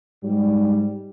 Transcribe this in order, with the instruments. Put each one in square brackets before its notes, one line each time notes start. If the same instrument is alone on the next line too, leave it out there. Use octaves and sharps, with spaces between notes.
[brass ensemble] G#2 G3